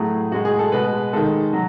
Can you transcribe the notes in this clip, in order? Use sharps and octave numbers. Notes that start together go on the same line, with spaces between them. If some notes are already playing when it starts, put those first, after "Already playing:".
Already playing: A2 F#3 A3 G#4
A2 G#3 F#4
G#4
A4
B2 G#3 B4
D#3 G#3 A4
F#3